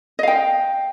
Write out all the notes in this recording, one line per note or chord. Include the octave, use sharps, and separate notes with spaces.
D#5 F5 G5